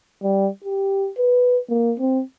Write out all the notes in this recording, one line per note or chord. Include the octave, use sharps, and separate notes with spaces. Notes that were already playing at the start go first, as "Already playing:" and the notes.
G3
G4
B4
A#3
C4